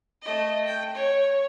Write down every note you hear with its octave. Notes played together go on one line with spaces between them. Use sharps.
A3 D#5
G5
C#5